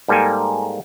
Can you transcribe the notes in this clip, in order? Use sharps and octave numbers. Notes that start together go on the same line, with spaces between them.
G#2 G3 A#3 A4 G5 G#5